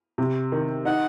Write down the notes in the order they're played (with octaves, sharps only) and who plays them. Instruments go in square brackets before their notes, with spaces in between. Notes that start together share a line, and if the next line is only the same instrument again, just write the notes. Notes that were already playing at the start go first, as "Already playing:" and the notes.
[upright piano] C3
D#3
[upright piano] D#4 [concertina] F#5